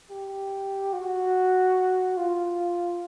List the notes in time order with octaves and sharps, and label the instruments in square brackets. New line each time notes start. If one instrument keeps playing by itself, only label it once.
[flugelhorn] G4
F#4
F4